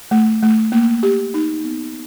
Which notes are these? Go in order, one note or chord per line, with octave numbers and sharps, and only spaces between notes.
A3
A3
A#3
G4
D#4
B3